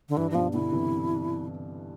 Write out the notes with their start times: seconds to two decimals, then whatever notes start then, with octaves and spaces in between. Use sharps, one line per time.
0.09 D3
0.17 G2 E3
0.31 E3
0.35 G2 B2 F3
0.53 B2 D3 E4
0.72 C3 E3